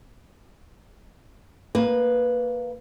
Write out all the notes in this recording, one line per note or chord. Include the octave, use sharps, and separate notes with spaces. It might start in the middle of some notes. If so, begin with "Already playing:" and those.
A#3 B4